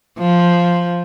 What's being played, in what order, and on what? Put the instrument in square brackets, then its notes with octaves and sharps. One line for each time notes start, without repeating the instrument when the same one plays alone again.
[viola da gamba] F3